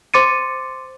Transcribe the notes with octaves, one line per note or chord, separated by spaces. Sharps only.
C5 C6 D6 A6 C#7 D#7